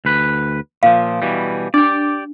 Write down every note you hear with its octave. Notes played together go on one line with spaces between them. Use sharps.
D2 B4
A#2 F3 F5
B2 E3 G3
D4 G4 D5